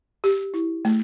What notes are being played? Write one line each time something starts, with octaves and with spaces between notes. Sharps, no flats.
G4
E4
A3